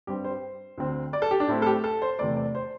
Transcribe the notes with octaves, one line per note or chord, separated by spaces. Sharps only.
G2 G3 C4 G4
C5
D2 D3 C4
D5
A4
G4
D4
A2 A3 C4 E4
A4
G4
A4
C5
E2 C3 A3 D5
D5
C5